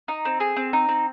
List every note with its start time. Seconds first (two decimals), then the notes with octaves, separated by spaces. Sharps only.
0.08 D#4
0.25 C4
0.40 G#4
0.56 C4
0.73 D#4
0.89 C4